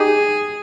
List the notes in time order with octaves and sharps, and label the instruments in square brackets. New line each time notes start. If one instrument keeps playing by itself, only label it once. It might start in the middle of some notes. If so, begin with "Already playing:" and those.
Already playing: [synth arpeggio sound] D#4 G4 [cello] G#4